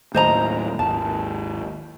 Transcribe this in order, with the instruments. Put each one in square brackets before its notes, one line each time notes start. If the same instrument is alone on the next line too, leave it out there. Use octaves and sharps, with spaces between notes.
[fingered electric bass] D#2 A2 [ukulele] C5 D#5 A#5
[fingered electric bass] G#1 D#2 [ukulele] A5